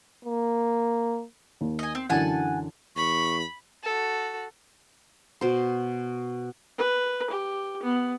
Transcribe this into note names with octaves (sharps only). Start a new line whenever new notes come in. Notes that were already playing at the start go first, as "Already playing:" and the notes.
A#3
D#2
D#5 G#5
C4
F#2 D3 E3 F#5 G#5 A5
E2 B5 C#6
F#4 A4
B2 C5
B4
G4
B3